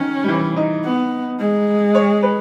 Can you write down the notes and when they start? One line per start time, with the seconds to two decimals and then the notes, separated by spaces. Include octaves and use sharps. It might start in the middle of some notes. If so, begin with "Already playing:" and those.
Already playing: D#3 C#4
0.24 G3
0.28 E3
0.56 D#4
0.84 B3
1.40 G#3
1.95 C#5
2.23 B4